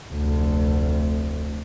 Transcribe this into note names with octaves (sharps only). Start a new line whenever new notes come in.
F1 D2